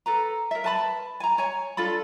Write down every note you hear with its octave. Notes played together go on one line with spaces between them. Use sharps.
A4 B4 A#5
A#4 E5
B4 A5 B5
G#5 A#5
C#5 G#5
D4 F4 A4 B5